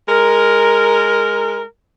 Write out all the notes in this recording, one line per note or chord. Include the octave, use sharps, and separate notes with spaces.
G#3 A#4